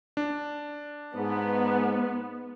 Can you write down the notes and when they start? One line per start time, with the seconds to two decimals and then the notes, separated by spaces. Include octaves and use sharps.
0.17 D4
1.15 G#2 B3